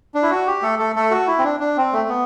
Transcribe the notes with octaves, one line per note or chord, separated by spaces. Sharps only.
D4
E4
F#4
G4
A3 A4
A3 A4
A3 A4
F#4
E4
C4
D4
D4
C4
A3
B3